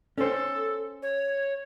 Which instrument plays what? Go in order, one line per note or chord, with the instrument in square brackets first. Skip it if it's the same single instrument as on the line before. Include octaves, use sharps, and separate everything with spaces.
[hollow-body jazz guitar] C#4 C5 [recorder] A4
[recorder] C#5